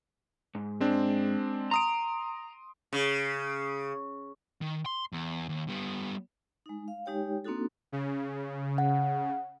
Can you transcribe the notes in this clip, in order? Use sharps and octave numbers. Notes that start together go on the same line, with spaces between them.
G#2
G#3 C4 D4
A#5 C6 D#6 D7
C#3
D#3
C6
E2
D#2
G3 B3
G#3 D#4
F5
G#3 D#4 G4 C#5 G5
A#3 C4 D4 D#4 F#4 A4
C#3
F#5